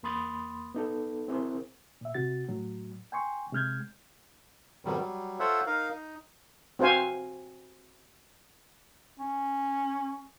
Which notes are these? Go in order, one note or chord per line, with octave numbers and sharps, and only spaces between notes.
E2 A#3 B5 C6 D#6 A6
B3 D#4 A4
C4 E4 G#4 A#4 C5
A#2 E5
C3 F#4 A6
A2 F#3
G5 G#5 C6 C#6
C3 G#3 F6 G6 G#6
F2 G#2 B2 D#3 F#3 G3
F#3 G3
F4 A4 C5 C#5 E5 F#5
D#4 A#4 F5
D#4
C4 F#4 C5 F5 G#5
C#4